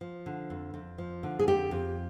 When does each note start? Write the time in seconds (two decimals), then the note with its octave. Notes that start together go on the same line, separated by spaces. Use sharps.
0.01 F3
0.26 D3
0.50 F2
0.74 F2
0.98 F3
1.23 D3
1.39 G#4
1.47 F2 G4
1.71 F2